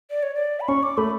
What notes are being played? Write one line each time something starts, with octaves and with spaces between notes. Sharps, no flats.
D5
C#5
D5
B5
C#4 C#6
D6
A3 B5